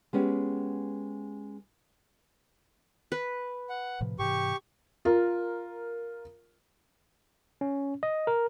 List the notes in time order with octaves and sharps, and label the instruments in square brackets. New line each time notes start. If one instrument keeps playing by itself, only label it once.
[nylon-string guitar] G#3 B3 C#4 G4
[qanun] B4
[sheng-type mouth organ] F#5
[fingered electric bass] A2 C3 F3
[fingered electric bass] G#2 C3 E3 [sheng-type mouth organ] G4 C#6
[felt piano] F4 A#4
[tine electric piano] C#4
D#5
A#4